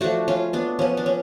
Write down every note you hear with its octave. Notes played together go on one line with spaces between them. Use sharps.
F3 A3 D4 F#4
C#4 F4
B3 D4
F3 B3 C#4
D4
C#4